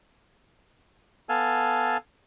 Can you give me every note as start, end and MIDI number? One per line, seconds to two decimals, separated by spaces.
1.29 1.97 59
1.29 1.97 69
1.29 1.97 77
1.29 1.97 80
1.29 1.97 81